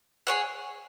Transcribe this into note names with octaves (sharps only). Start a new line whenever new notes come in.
G#4 C#5 F#5